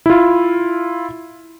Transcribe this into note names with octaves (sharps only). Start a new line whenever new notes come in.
E4 F4